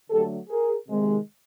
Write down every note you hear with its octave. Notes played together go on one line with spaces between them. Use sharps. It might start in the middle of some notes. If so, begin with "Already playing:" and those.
D3 F#3 A3 G4 A4
G#4 A#4
C3 D#3 G#3